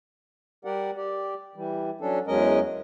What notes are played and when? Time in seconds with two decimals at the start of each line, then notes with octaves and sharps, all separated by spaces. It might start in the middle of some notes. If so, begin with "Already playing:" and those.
0.65 G3 G4 A#4 D5 F#5
0.96 G4 D5
1.56 E3 G3
2.01 F#3 C#4 D4 A4
2.27 E2 F#3 G#3 C#4 A#4 D#5